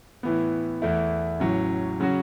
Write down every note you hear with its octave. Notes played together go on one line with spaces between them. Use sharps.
A2 E3 B3
E2 E3 A3 E4
A1 A2 F#3 C#4
C#3 F#3 C#4 F#4